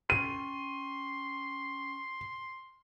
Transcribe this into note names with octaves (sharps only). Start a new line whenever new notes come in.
C#4 G5 C6 C#6 D#7